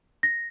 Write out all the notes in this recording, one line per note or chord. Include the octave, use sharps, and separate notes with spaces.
A#6